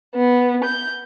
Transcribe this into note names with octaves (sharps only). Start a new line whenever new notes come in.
B3
G6